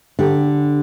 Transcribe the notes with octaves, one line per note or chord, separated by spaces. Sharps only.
D3 G4